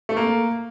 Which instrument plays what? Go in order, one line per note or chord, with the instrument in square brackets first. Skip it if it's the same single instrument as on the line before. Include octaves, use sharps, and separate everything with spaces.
[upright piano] A3
A#3